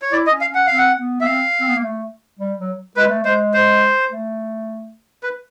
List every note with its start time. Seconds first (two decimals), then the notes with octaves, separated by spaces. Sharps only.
0.02 C#5
0.12 E4 D5
0.27 D#5
0.31 C#4
0.41 F5
0.51 C#4 F#5
0.67 C4 F5
0.78 F#5
0.97 B3
1.21 B3 E5
1.25 C4 F5
1.60 C4
1.68 B3
1.76 A#3
1.83 A3
2.39 G3
2.59 F#3
2.96 G#3 B4
3.09 A3
3.23 G#3 C5
3.54 C5
4.11 A3
5.23 B4